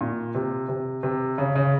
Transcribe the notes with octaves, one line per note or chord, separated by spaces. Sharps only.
A#2
C3
C3
C3
C#3
C#3